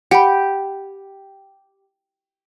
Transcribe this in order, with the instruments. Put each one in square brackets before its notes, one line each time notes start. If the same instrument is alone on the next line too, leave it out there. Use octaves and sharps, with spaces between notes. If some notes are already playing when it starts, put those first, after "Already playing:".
[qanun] G4 [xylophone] F#5 B5